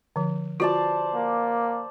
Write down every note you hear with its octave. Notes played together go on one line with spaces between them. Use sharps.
D3 F3
F4 F#4 C5 D5 A5
A#3